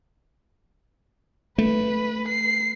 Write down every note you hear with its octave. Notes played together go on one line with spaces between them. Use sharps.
A3 B4
C7